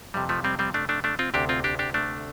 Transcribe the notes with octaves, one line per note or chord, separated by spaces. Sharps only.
F2 C3 G3
F3 A3
G3 C4
G3 C4
A3 D4
A3 D4
A3 D4
C4 F4
D2 C3 D4 G4
C4 F4
D4 G4
D4 G4
A3 D4